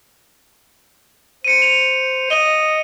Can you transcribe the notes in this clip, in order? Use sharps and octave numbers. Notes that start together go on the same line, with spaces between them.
C5 C#7 D#7
F7
D#5 D#7 G7